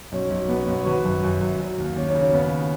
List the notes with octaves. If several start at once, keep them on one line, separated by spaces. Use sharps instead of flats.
B1 C#4
B1
B1 B3
C#4
B1 B3
C#5
G#1 F#4 B4
F#2
F#2
F#2
F#3
D#2
D#2 C#4
C#4
C#3
C#4
D#2 B3